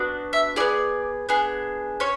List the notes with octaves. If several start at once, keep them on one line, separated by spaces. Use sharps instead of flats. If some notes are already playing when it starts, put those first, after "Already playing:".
Already playing: B3 D4 F#4
E5
B3 E4 G#4 D5
B3 D4 G#4
C#4 C#5